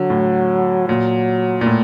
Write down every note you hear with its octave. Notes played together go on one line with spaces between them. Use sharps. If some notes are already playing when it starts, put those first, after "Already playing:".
Already playing: D3 F#3
A2
A#2 F#3
A#2
A2